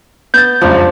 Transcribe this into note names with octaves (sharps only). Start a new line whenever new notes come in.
B3 G6 A6
F1 C#2 F#2 F3 D4